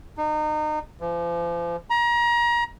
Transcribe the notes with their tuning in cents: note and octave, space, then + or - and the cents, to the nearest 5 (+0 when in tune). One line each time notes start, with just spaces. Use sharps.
D#4 -30
F3 -40
A#5 +30